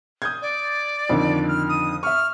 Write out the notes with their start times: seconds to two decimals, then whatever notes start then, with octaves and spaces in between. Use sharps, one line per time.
0.22 D#6 G6 G#6
0.42 D5
1.09 F2 D3 D#3
1.48 F6
1.69 D#6
2.03 E5 C#6 F6